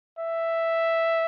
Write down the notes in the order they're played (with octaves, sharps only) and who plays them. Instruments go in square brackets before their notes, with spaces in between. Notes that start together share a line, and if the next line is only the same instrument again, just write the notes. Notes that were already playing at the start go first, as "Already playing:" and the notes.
[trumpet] E5